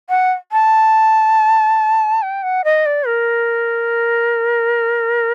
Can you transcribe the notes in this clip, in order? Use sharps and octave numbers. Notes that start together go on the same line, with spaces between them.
F#5
A5
G5
F#5
D#5
D5
A#4